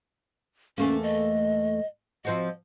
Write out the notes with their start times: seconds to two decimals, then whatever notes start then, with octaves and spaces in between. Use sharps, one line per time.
0.78 E2 A3 A#3 C#4
1.03 D#5
2.25 F3 C4 F#4 D#5